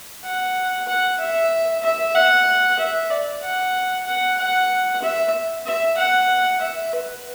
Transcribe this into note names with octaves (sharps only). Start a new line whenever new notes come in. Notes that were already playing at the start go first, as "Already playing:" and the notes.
F#5
F#5
E5
E5
F#5
E5
D5
F#5
F#5
F#5
E5
E5
F#5
E5
B4